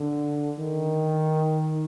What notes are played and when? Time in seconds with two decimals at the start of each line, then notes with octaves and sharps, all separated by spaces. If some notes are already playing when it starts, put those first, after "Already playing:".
Already playing: D3
0.59 D#3